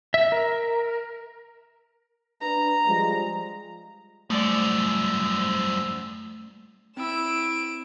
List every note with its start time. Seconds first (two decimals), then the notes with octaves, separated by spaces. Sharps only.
0.14 E5
0.32 A#4
2.41 D4 B4 A#5
2.87 F3 G3 G#3
4.30 F#2 F3 G3 A3 D5 E6
6.97 C4 E4 E6 D7 E7